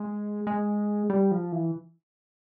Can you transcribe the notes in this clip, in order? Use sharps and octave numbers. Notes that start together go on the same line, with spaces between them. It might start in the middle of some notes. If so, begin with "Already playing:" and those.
Already playing: G#3
G#3
G3
F3
E3